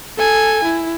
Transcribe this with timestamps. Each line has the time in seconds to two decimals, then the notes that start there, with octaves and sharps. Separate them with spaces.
0.18 A4 G#5
0.64 E4